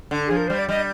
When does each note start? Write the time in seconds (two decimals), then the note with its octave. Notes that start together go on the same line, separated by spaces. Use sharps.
0.11 D3
0.27 F3 G#4
0.37 A#4
0.47 G3 C5
0.58 D5
0.69 G3 D#5